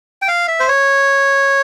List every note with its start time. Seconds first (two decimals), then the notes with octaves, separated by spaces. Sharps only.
0.22 G5
0.28 F5
0.48 E5
0.60 C5
0.68 C#5